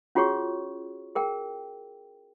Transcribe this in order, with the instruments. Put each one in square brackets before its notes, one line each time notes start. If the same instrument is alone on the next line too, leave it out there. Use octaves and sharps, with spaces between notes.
[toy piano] C#4 F4 F#4 G#4 C#5 C#6
G#4 A#4 G5